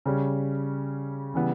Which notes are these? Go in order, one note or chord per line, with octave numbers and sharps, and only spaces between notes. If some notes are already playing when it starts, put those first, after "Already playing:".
C#3 G3 C#4
C#3 E3 G3 B3